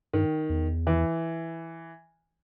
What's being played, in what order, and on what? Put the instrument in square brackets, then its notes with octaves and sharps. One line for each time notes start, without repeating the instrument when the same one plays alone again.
[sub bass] G2 [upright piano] D#3
[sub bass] E2
[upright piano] E3